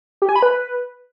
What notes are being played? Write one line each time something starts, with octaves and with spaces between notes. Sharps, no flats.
G4
G#5
B5
B4